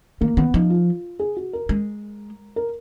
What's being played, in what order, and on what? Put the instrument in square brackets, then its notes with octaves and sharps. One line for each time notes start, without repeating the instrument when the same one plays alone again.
[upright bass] D#3 [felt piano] A#3
[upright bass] D#3 [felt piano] B3
[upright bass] F3 [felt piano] D#4
[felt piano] F4
G#4
F#4
A#4
[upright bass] G#3
[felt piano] A#4